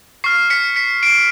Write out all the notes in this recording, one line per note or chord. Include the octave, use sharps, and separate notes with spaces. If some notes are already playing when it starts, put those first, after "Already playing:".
C#6 F6 C7
B6 C#7
B6 C#7
C7 D7